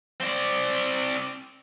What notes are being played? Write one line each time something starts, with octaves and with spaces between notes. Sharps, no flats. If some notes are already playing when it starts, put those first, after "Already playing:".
C4 D5